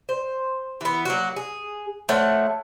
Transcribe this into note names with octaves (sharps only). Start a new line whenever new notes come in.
C5
E3 B3
F#3 A#3 F#4
G#4
F3 A3 C#5 F#5